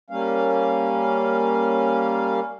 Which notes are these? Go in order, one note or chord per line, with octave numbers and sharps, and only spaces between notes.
G3 A#3 C#4 F5